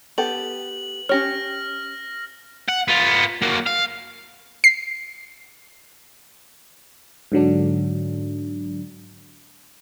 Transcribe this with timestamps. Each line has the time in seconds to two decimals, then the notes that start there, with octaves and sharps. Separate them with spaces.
0.18 B3 G4 A4 F#7
1.09 C#4 G4 C#5 F6 A#6
2.68 F#5
2.88 B3 F4
3.42 F#3 A#3
3.67 F5
4.64 C7
7.32 G#2 D3 F#3 D4